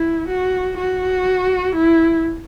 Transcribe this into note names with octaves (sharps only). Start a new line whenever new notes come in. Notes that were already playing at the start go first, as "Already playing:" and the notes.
Already playing: E4
F#4
F#4
E4